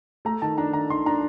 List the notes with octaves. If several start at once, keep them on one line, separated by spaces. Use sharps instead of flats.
A3 A#5
D#3 A5
D4 A#5
D#3 A#5
D#3 C6
D4 A#5